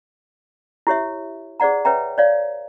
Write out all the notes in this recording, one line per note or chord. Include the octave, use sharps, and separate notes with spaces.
E4 G4 C#5 E5
G#4 C5 D5 F#5 A#5
B4 C#5 E5 G5 A#5
C#5 D5 F5